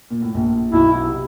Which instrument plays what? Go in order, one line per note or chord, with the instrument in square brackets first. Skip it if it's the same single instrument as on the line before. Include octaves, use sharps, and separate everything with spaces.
[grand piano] A#2
A2
A#1 A#2
[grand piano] B1 B2 [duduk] E4
[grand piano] C3